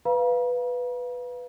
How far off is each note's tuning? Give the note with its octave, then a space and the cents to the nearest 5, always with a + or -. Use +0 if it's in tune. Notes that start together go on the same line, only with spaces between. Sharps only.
B4 +0 F5 +0 A#5 +45